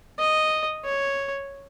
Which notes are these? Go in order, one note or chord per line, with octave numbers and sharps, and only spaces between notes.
D#5
C#5